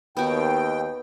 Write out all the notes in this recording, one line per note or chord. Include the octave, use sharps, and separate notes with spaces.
D#2 B3 F#4 G5